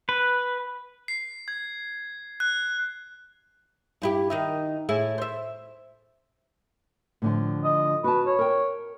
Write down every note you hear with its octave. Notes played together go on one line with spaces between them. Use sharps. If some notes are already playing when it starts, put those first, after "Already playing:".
B4
C7
G#6
F#6
G2 E4 G4
D#3 D#4 E5
A2 E4 G#4
C5 E5
A2 D3 F3
D#5
F#4 B4 A5
C#5
A#4 G5